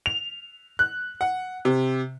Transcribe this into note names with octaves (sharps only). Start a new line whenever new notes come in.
F7
F#6
F#5
C3